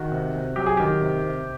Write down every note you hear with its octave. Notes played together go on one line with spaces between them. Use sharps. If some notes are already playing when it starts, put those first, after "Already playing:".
Already playing: D#3 F#4
C3
C3
F#3 G4
G#4
D#3 G4
C3
C3